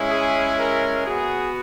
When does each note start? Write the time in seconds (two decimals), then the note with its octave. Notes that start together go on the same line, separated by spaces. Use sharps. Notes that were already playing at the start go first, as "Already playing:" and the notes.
Already playing: G#3 C#4 E4
0.11 G#4
0.59 A#4
1.05 B3 F#4 G#4